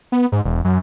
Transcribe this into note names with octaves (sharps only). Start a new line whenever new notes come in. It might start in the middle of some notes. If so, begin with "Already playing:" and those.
B3
G#2
E1
F#2